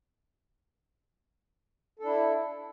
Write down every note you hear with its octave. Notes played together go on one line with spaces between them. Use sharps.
D4 E4 A4